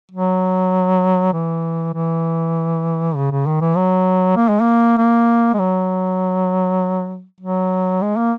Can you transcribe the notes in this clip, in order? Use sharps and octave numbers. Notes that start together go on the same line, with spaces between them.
F#3
E3
E3
C#3
C#3
D#3
E3
F#3
A#3
G#3
A#3
A#3
G#3
F#3
F#3
G#3
A#3